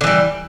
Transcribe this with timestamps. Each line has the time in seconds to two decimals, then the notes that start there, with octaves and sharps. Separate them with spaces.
0.01 D3
0.04 E3
0.07 G3